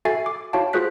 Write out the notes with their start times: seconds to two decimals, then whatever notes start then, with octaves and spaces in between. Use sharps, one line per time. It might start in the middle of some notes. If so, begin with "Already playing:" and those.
0.05 F#4 A4 E5 G#5 A6 C7
0.26 D6
0.53 E4 F#4 C#5 F5 G5 A5
0.73 F4 F#4 G#4 C5 F#6 B6